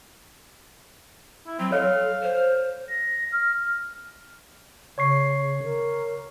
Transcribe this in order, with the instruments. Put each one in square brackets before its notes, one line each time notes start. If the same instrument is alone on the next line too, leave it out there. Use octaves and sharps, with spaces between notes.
[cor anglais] E4
[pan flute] F#3 [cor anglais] C4
[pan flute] A4 [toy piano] C#5 [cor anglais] F5
[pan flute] C5
[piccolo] A#6
F6
[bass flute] C#3 [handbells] C#5 C#6 C7
[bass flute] A#4